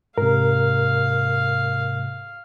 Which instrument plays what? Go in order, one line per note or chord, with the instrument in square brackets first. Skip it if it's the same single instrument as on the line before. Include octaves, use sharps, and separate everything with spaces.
[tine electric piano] G#2 C3 [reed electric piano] A#4 [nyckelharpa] F5